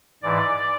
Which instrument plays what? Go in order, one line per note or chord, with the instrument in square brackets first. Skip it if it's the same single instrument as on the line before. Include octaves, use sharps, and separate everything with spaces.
[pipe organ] G#2 E3 D5